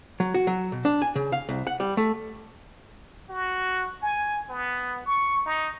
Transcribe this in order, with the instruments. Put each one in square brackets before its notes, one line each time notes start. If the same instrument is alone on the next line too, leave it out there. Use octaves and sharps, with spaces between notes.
[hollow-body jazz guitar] F#3
F#4
F#3
B2
D4
G#5
C#3
F5
C2
F#5
G3
A3
[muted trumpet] F#4
G#5
B3
C#6
D#4